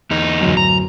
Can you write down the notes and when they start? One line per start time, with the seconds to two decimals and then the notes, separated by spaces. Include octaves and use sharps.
0.11 E2 D#4
0.41 D1 F#2
0.57 A#5